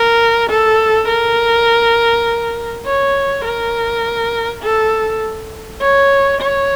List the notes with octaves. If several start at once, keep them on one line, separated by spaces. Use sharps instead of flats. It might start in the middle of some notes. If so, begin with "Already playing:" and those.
Already playing: A#4
A4
A#4
C#5
A#4
A4
C#5
C#5